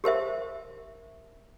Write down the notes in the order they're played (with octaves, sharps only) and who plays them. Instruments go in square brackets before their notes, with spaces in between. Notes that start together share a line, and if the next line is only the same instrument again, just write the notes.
[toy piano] G4 A#4 C5 E5